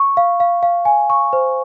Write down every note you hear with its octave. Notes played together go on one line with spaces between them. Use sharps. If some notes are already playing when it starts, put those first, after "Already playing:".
Already playing: C#6
F5
F5
F5
G#5
C#6
C5